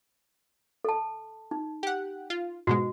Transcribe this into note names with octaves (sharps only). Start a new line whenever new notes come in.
A4 A5
D#4
G4 F#5
F4
G#2 B2 G#3 F#4